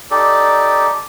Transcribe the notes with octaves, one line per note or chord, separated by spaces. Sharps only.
D#4 G4 A4 D5